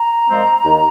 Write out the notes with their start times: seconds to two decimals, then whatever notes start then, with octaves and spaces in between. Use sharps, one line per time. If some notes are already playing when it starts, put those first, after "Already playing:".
Already playing: A#5
0.29 A#2 F3 G#3 C4
0.64 D#2